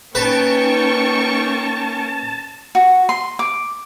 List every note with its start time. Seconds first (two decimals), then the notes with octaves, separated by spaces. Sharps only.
0.15 A#3 C#4 D#4 B4 G5 A5 C#6
2.75 F#4
3.09 C6
3.39 D6